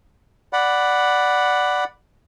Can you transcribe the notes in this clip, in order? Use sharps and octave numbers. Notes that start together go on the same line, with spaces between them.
D5 F#5 B5